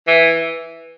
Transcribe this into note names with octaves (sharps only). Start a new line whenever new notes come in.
E3